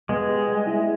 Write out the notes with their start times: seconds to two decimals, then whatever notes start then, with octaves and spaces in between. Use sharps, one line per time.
0.09 G#3 B3
0.28 G4
0.47 G3
0.67 E4